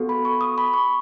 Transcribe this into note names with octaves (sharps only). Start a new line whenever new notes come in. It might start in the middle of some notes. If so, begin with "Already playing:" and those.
Already playing: B3 F#4 A4
B5
C#6
D#6
B5
C#6